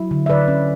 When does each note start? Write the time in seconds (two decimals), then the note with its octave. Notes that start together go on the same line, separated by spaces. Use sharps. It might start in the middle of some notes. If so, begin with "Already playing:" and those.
Already playing: F#3 E4
0.11 D3
0.26 E5
0.30 D3 B4 D5
0.48 C#4